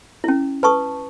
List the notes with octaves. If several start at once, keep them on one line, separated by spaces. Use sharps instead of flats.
C#4 E4
B4 A5 C#6 D#6